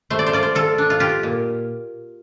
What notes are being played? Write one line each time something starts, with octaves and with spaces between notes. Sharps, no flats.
A3 C5
D5
C5
F4 D5
C5
F4 A4
D4
F4
F4 G4
A#2